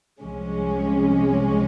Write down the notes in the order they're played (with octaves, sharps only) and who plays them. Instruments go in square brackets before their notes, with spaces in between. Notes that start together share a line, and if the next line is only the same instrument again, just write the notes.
[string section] C2 C3 F3 G#3 C#4